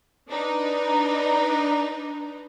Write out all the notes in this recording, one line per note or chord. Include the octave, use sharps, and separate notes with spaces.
D4 D#4 B4